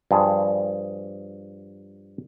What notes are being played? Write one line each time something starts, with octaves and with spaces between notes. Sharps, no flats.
G2 F3 G#4